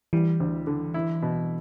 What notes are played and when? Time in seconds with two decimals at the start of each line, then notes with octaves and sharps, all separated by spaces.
0.13 E3 G3
0.40 D2
0.67 D3
0.94 E4
1.22 B2